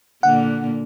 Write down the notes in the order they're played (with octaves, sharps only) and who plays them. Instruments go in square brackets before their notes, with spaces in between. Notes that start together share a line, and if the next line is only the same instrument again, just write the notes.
[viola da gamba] A#2 D3 A#3 [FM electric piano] F#5